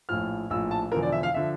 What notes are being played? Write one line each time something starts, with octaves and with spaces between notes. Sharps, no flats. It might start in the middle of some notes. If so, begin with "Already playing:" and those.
A#1 A2 F3 F6
A#1 A2 F3 E6
A5
E1 E2 D3 F3 A#4
D5
E5
F5
D3 F3 E5